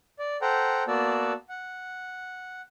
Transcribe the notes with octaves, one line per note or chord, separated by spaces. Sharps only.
D5
A4 C5 F#5 G5 A#5
A#3 B3 F#4 D5 A5 E6
F#5